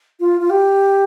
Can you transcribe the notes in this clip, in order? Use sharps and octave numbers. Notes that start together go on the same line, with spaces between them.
F4
F4
G4